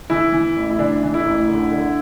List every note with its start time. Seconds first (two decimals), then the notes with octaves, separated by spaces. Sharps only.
0.10 E3 E4
0.33 E3
0.56 A1
0.70 E4
0.79 E3 D4
1.03 E3
1.14 E4
1.25 A1
1.48 D3
1.72 D3